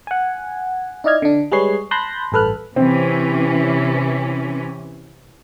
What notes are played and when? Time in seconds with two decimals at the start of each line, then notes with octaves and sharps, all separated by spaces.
0.07 F#5 G#5
1.04 D#4 E4 D5 D#5 F6 G#6
1.22 D3 D4
1.52 G3 G#3 G#4 B4 C#5 C7
1.91 A5 B5 C6 F#6 G6 A#6
2.32 A1 G2 A4 B4 F6 F#6
2.76 C3 E3 C4 C#4